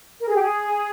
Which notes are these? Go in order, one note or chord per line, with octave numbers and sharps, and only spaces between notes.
A#4
G#4
G4
G#4